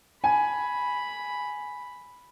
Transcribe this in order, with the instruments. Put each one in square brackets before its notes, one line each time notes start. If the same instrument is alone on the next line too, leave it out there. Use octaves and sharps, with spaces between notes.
[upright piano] G#5 [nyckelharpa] B5